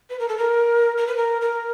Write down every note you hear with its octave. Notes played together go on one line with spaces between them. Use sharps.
B4
A#4
A4
A#4
A#4
B4
A#4
A#4